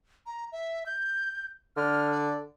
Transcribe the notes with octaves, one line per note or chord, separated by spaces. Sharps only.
A#5
E5
G6
D3 F6
D5